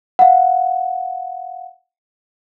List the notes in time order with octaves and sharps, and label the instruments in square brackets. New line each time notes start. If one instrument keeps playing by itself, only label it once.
[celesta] F5 F#5